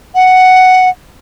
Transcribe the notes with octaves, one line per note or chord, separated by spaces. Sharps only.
F#5